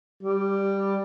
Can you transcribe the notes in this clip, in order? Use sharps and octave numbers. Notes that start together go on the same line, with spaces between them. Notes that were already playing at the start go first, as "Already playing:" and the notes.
G3